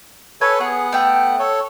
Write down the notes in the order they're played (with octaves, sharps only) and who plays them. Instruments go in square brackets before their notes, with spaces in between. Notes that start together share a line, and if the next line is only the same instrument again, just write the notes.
[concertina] A4 B4 C#5 [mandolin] G#5
[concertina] B3 F#5 [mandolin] G#4
[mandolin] A3 G5
[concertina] A4 C#5